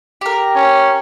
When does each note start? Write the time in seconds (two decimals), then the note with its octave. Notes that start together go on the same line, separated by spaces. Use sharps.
0.21 G4 A#4
0.55 C#4